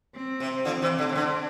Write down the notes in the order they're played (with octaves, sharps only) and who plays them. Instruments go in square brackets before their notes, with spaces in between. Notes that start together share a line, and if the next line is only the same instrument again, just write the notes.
[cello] C4
[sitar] C3
D3 F3
C3 E3
D3
C3
[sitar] D3 [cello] D4